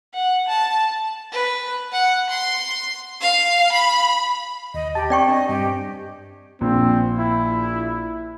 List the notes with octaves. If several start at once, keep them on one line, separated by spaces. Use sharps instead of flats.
F#5
A5
B4
F#5
C6
F5
B5
D#2 D#5
G4 A5
C4 D5 G5 C#6
D4 D#5
G2 C4 G4
A#1 C4
E4